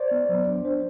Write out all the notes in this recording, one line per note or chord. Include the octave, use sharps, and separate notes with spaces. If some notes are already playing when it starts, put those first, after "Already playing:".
Already playing: C5 D5
B3
F#3
D4
D4 C5